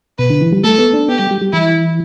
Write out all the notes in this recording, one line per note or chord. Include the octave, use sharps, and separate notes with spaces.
B2 B4
D3
E3
G3
A3 A4
B3
D4
B3 G4
G3
G3
G3
E3 E4